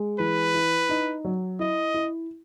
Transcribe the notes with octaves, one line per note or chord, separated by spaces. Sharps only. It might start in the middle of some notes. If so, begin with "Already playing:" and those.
Already playing: G#3
E3 B4
E4
D#4
F#3
E4 D#5
E4